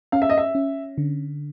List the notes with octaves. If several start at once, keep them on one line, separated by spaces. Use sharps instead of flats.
C#4 F5
E5
D#5
E5
C#4
D3